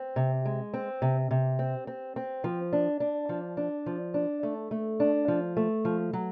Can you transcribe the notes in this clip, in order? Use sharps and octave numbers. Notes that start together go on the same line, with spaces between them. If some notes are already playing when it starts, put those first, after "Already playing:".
Already playing: C4
C3
G#3
C4
C3
C3
C4
C4
C4
F3
D4
D4
F3
D4
F3
D4
A3
A3
D4
F3
A3
F3
F#3